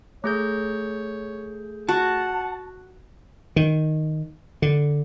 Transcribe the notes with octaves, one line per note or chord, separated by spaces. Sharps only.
A3 G#4 C#5 G6
F#4 F#5 A5
D#3
D3